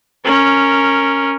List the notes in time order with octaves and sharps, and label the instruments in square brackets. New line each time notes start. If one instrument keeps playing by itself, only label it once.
[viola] C#4 A#4